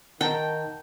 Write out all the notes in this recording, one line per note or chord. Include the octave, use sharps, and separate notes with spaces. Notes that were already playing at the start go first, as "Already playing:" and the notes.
D#3 F#5 G5 A5 A#5